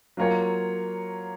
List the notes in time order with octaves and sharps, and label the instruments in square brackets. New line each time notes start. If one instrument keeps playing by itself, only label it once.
[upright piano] F#3 A#3 F4 A#4 C#5